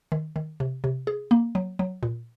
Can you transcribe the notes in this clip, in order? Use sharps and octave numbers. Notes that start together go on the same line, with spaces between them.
D#3
D#3
C3
C3
G#4
A#3
F#3
F#3
A#2